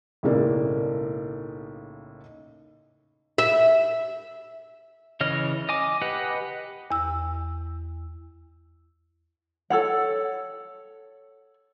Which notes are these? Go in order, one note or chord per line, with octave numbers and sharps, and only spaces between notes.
B1 A2 C#3 G#3 A#3 D5
E5
C#3 E3 C#5 D#5 F6
D#5 G#5 D6
G4 B4 D#5 F#5
E2 E6
A4 C#5 F#5